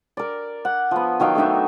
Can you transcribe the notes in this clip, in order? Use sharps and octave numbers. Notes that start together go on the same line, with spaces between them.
A#4 D5
F#5
F3 B3
D#3 F#3 F5 G5
A3 D4 D#4 E5